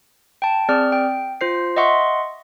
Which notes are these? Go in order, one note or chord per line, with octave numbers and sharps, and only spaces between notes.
G5 A5
C4 G#4 D5 F6
G5
F4 C5 C7
D#5 E5 F#5 C6 C#6